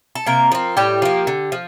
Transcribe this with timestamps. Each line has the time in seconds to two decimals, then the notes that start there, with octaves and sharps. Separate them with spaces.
0.15 A4
0.26 C3 A#3 A#4
0.52 F3 C4
0.77 A2 G3 G4
1.02 F3 A#3
1.27 D3
1.52 F3